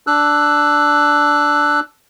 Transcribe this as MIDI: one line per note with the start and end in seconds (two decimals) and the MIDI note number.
0.07 1.80 62
0.07 1.80 88
0.07 1.80 90